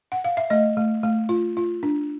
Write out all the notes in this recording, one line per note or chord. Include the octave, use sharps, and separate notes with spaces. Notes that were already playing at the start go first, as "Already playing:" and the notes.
F#5
F5
E5
A3 D#5
A3
A3
F4
F4
D4